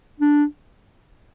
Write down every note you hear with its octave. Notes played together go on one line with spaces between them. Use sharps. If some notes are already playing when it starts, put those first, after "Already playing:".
D4